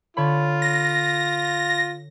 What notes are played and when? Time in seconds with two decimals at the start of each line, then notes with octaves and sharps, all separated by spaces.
0.17 D3 F4 C#5 B5
0.62 A#6